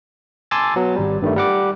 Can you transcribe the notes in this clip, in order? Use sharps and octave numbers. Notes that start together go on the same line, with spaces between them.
G#5 A5 C6 D6 E6 A6
F#3 B3
G#1 G3
G2 D#3 G3 A3
G3 F#5 D6